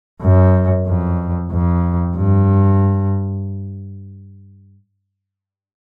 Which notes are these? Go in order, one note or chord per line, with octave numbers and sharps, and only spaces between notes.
F#2
F2
F2
G2